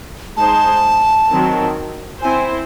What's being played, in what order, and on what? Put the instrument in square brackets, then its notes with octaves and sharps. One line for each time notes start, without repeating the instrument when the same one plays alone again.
[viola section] G#3 D#4 G#4 C5 [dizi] A5
[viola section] D#3 F#3 C4
[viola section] C4 E4 C5 [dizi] G#5